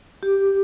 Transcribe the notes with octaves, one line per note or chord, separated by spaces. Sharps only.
G4